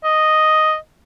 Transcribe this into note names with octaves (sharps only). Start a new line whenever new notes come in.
D#5